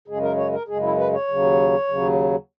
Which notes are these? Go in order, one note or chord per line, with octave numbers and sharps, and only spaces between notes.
F#2 C#3 G#3 G#4
A#4
C#5
A#4
F#2 C#3 G#3 G#4
E4
B4
C#5
D#2 C#3 F#3
D#2 C#3 F#3